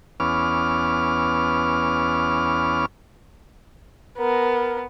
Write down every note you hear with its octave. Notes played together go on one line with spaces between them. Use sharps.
E2 B3 C#4 D6 F6
B3 A#4